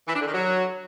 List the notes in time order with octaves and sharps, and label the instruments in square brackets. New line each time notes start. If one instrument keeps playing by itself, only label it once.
[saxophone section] E3
D4
D3
D#3
F#3